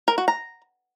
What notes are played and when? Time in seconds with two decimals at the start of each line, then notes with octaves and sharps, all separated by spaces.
0.08 A#4
0.18 F#4
0.28 A#5